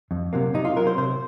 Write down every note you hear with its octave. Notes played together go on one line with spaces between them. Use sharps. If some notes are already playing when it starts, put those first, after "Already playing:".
F2
C3 F#3 A#3
C3 D#4
F4
F#3 C4 A#4
C5
C3 C5